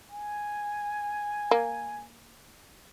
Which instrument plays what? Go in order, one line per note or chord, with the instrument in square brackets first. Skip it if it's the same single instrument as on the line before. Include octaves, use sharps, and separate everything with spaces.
[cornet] G#5
[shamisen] A#3